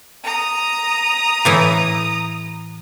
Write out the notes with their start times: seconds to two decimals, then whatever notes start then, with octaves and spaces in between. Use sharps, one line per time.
0.25 A#5 D#6
1.45 A2 E3 E4